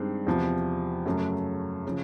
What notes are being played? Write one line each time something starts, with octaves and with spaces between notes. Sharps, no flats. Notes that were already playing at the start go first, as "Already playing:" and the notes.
Already playing: G2 D#3 G#3 C4
E2 C3 F3
F#2 C#3 F#3 A3
C#3 F3